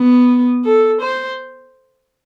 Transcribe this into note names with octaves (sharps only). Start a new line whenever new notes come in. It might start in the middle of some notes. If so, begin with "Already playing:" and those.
Already playing: B3
A4
C5